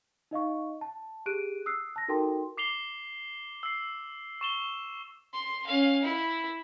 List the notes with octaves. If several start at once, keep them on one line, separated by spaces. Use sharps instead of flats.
D#4 D#5 F5 C#6
A5
G4 G#4 F#6 D7 D#7
D#6 E6 F#6 C7
A5 A#6
D#4 F#4 A4 A#4 G5 C6
D6 C7 F7 G7
E6 C7
C#6 E7 G7
C6
C#4 F5
E4